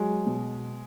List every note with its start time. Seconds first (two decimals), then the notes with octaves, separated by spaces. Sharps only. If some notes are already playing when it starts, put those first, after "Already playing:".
Already playing: F#3 G#3
0.27 B2